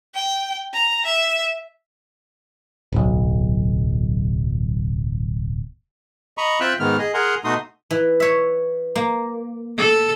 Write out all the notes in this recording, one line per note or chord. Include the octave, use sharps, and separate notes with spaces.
G5
A#5
E5
D1 B1
D#5 A#5 B5 C#6
C4 F4 E5 G5 E6 F#6
G#2 D#3 G#3 B3 F6
G#4 D#5
G#4 A#4 F#5 G#5 A#5 C6
B2 A3 D#4 F#4 C6 D#6
E3
C#5 E5
A#3
A4